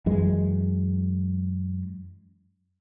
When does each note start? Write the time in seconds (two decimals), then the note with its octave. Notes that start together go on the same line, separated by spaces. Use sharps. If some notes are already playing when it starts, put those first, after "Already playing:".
0.06 F#2 E3 G#3